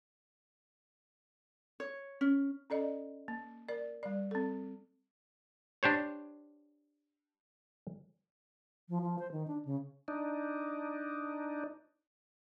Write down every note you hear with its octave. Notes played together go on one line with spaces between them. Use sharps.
C#5
C#4
C#4 A4 D5 D#5
A#3
A#4 D5
G3 D5
C4 A4
D4 G4 C5 C#5
F3
F3
C5
D#3
D4
C#3
D4 D#4